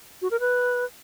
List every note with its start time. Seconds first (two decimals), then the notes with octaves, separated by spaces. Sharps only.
0.22 F#4
0.31 A#4
0.40 B4